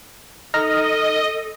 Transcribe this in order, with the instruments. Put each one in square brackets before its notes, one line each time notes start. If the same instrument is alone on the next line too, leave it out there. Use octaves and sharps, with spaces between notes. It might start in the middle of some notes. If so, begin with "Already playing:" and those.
[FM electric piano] D#4 F6 A#6 [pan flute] A4 [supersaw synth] D#5